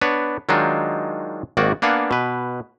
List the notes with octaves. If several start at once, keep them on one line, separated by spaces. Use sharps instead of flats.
B3 D4 B4 C#5
D#3 F#3 G#3 D4 D#4 F4
G#1 D#3 A#3 F#4 D5
A#3 B3 D4 F5 F#5 G#5
B2 B4